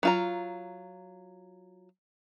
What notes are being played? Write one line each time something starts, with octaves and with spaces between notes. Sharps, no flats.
F#3 F4 A#5